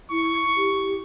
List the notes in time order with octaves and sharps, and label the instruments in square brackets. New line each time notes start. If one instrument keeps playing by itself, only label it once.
[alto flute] E4 [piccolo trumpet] C#6
[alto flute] G4